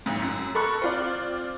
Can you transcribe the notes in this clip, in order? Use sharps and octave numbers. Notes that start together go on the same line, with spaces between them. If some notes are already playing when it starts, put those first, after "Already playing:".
A1 G#2
F#2
A4 A#4 B5 C#6 F#6
C4 F4 D5